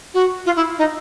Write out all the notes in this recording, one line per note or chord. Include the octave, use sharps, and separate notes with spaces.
F#4
F4
E4
D#4